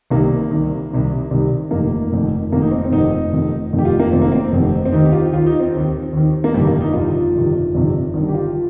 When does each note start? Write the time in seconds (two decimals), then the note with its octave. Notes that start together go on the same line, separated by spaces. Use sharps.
0.10 C2 C3 D#3 A#3
0.51 C2 C3 D#3
0.91 C2 C3 D#3
1.31 C2 C3 D#3
1.71 F1 F2 D#3 A#3
2.12 F1 F2 D#3
2.52 F1 F2 D#3 A#3
2.62 D#4
2.71 C4
2.85 C4
2.91 F1 F2 D#3 D#4
3.32 F1 F2 D#3
3.73 F1 F2 D#3
3.79 G4
3.85 F4
4.00 A#3
4.12 F1 F2 D#3 C4
4.22 A#3
4.32 C4
4.52 F1 F2 D#3
4.85 C4
4.92 D#2 D#3 D#4
5.05 G4
5.12 F4
5.33 D#2 D#3 F4
5.46 D#4
5.60 C4
5.73 D#2 D#3
6.13 D#2 D#3
6.44 A#3
6.54 G1 F2 C3 D#3 G3
6.67 A#3
6.81 D#4
6.93 G1 F2 C3 D#3 F4
7.35 G1 F2 C3 D#3
7.74 G1 F2 C3 D#3
8.14 G1 G2 D#3
8.28 G4
8.35 F4